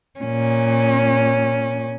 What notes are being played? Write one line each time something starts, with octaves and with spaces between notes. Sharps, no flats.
A#2 C#4